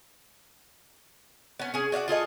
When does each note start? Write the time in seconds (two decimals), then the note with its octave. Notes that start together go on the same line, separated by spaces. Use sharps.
1.59 B3 C#4
1.74 C#4 G#4
1.92 F#4 D5 F5 F#5
2.08 F4 G#4 A4 D#5